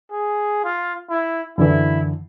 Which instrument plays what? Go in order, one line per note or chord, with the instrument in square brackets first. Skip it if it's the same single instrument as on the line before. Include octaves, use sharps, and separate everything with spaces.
[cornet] G#4
F4
E4
[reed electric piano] F#2 D3 E3 [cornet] E4